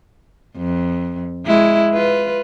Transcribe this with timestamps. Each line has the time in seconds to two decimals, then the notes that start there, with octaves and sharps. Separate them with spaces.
0.57 F2
1.46 G#3 E4
1.93 F4 B4